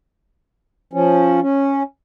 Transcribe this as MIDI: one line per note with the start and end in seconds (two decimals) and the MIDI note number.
0.93 1.40 53
0.93 1.40 61
1.42 1.83 61